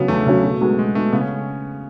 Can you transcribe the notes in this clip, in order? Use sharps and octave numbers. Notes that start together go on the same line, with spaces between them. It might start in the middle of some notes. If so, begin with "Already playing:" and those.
Already playing: C#3 F#3 B3 C#4
E2 A3
C#3 F#3 C#4
B2
G#3 B3 F#4
B2 G#3
G#3 A3 B3 F#4
C#3 B3
C#4